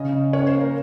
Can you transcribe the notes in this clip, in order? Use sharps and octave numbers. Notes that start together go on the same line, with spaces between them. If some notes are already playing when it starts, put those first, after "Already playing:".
Already playing: C#3 C#4 D#5
C#3
C#4 C#5
C5
A#3
A#4